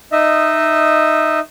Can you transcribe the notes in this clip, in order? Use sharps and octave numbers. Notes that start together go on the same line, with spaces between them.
D#4 D#5 E5